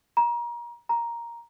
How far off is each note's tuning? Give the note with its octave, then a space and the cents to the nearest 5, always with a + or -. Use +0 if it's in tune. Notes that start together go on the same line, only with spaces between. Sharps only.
A#5 +30
A#5 +5